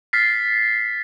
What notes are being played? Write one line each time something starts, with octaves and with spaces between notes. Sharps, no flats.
F6 A6 B6 C7